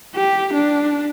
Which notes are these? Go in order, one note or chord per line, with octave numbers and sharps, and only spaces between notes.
G4
D4